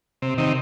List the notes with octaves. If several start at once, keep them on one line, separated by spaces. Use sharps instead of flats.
C3
C3 D#3